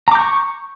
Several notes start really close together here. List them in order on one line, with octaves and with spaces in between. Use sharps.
A#5 D6 G6 C#6